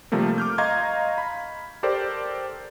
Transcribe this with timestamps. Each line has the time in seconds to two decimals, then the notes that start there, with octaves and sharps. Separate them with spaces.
0.12 C3 F3 G3 A3 A#3
0.38 D6 F6 G6
0.58 D#5 F5 A#5 C6 C#6 G#6
1.18 B5
1.83 G4 A4 A#4 C5 D5